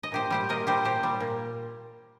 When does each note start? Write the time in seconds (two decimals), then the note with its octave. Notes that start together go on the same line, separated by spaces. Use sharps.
0.03 D#5
0.12 A#2 G4 C5
0.30 G3 G4 C5
0.49 A#2 A#4 D#5
0.67 G3 G4 C5
0.85 A#2 G4 C5
1.03 G3
1.20 A#2